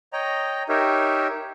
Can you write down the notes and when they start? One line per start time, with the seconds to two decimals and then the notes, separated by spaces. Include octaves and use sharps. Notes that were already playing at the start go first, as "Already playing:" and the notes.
0.13 C#5 D#5 G5 A#5
0.69 D#4 G4 A#4 C#5 E5